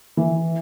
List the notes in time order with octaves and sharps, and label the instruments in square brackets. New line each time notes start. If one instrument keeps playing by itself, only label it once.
[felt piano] E3